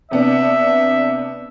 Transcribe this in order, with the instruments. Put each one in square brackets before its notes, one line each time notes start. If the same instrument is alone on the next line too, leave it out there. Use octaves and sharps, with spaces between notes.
[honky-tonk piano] C3 B3 D4 [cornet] E5